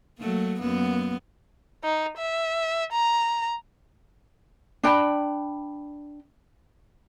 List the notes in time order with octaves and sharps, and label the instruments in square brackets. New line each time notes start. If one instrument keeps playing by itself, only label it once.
[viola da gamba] F#3 A3 A#3
F#2 A#3 B3
[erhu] D#4
E5
A#5
[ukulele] D4 G5 B5